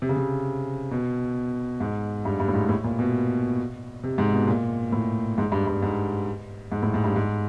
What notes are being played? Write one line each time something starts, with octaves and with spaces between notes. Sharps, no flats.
C3
C#3
C3
B2
G#2
G2
G2
A2
G#2
A2
A#2
B2
C3
G#2
B2
A#2
A2
G#2
G2
G2
G#2
G#2
A2
G#2
G2
G#2